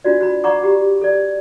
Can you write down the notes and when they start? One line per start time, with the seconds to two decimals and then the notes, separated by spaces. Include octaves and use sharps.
0.04 D4 F4 F#4 D5
0.21 F#4 B5
0.44 D5 F#5 A#5 B5 C#6 D6
0.63 G4
1.01 A4 D5